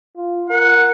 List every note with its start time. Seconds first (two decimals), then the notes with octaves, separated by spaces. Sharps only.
0.17 F4
0.50 A#4 F#5